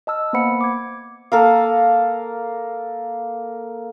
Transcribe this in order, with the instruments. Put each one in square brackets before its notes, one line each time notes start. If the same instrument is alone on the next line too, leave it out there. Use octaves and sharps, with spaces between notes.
[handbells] D#5 A5 E6 F6
A#3 B3 C5 F#5 B5 C#7
D6 G#6
[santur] A#3 A4 A#4 F5